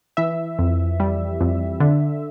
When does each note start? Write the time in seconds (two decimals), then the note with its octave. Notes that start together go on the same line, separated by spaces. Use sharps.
0.17 E3 E5
0.59 F2
1.00 G3
1.41 F2
1.80 D3